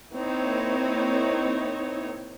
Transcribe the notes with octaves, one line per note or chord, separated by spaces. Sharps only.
A#3 C4 D#4 E4 C#5